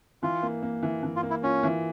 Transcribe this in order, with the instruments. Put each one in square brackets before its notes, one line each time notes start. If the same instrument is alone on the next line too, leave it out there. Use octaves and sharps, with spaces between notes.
[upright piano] E3 [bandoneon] F4
[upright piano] A#3
A#3
E3
E3
[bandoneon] F4
[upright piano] A#3
[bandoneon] E4
[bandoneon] C#4 [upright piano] F4
[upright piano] E3